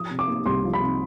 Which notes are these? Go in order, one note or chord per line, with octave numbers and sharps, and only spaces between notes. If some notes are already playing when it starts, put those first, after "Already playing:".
Already playing: F3 D#6
C3
D6
A#3
C2 C6
F3
B5
C3